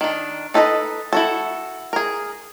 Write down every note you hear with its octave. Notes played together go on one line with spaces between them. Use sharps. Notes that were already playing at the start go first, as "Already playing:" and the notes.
D#3 D4
D#4 A4 B4 C5 D#5
E4 F#4 A4
G#4 A#4